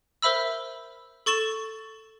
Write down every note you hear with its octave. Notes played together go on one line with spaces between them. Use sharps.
A#4 C5 E5 B5 E6
A4 C#6 A6 E7